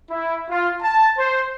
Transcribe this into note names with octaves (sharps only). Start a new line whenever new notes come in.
E4
F4
A5
C5